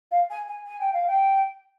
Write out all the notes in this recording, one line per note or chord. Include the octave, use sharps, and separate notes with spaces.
F5
G#5
G#5
G#5
G5
F5
G5